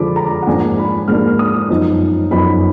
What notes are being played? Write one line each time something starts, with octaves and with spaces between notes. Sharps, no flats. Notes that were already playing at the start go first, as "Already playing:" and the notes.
Already playing: D3 F3 G#3 B5 D6
A#5
F#5
G#2 F3 A#3 D4 G#5
B5
G#2 F3 A#3 D4 F6
D#6
F#2 F3 B3 D#4
F#2 F3 B3 D#4 B5